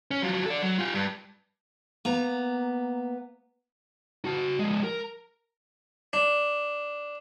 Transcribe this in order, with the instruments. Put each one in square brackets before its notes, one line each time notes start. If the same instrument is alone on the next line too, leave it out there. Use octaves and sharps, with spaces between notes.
[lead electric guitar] C#4
F3 F#3
A4 D5
F#3
F4 G4
G2
[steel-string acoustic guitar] A#3 B3 A#5
[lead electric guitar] F#4 A5
F3 G#3
A#4
[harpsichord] D4